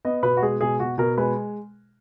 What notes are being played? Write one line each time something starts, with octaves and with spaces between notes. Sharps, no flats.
B3 D#5
B2 B4
F#4
G#3 G#4
B2 G#4
B2 F#4
B2 A#4
G#3 B4